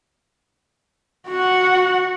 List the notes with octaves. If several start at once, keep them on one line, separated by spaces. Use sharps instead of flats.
F#4 F#5